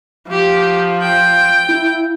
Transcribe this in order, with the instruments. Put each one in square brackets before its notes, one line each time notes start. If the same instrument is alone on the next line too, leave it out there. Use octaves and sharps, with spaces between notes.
[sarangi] F3 [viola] G4
[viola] G5
[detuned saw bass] E4